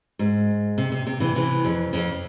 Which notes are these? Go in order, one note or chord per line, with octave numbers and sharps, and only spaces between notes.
G#2
C3
C3
C3
C3 E3
C3 E3
F2
F2